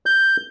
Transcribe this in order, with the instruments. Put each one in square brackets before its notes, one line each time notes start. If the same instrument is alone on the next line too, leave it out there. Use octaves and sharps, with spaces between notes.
[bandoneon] G6